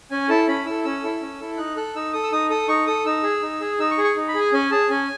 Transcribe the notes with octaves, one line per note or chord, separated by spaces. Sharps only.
C#4 G#5
E4 A4 A5
C#4 B5
E4 A4 E6
C#4 E6
E4 A4
C#4
E4 A4
D#4 F#6
A4 F#6
D#4 E6
A4 D#6
E6
D#4 D#6
A4 D#6
D#4 C#6
A4 D#6
D#4 E6
G#4
D#4
G#4
D#4 E6
C#6
G#4
C#6
D#4
B5
G#4
G#5
C#4 G#5
G#4 A5
C#4 G#5